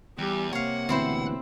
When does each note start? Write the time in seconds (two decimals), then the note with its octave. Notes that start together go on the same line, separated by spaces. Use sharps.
0.18 E2 G3 G4
0.53 C3 A#3 C#5 F5 F#5
0.89 D2 B2 E3 C4 E4 C5